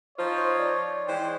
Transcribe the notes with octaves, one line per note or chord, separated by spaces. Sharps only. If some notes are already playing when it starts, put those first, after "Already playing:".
F3 D#4 F4 C5 C#5
D5
E3 G#3 C5 G5